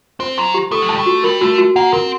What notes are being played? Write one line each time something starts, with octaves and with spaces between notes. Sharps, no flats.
C4 C5
F#3 C6
G4
A3 A4
F#3
G3 A5
A3
F#4
G3 A#4
A3 F#4
F#4
A#3 F#5
C4 A#4